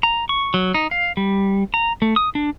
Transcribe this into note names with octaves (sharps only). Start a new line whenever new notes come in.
A#5
C#6
F#3
D#4
F5
G3
A#5
A3
D#6
D4